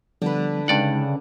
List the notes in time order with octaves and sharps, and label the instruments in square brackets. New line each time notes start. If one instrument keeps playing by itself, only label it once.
[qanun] D3 B4 [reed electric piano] F3 G3 B3
[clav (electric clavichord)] G2 D5 F#5 [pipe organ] C#3 [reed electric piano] G#3 D#4